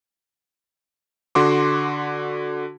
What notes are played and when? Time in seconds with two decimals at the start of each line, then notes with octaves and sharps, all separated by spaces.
1.35 D3 F#4 C6 D6